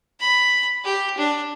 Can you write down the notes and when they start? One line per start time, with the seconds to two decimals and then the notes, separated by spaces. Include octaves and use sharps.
0.20 B5
0.84 G4
1.18 D4